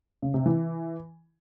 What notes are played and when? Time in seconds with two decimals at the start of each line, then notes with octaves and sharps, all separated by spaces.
0.22 C#3
0.34 C3
0.46 E3